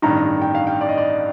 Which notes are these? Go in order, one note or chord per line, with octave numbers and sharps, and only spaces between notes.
A1 G2 D#3 A#5
G5
F5
G5
D5
D#5
D5